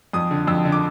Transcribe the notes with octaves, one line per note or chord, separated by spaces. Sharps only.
F2 D#6
D3
F2 E6
D3
D6